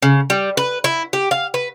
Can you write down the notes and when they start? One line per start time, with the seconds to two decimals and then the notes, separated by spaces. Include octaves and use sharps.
0.02 C#3
0.30 G3
0.57 B4
0.84 E4
1.13 G4
1.31 F5
1.54 B4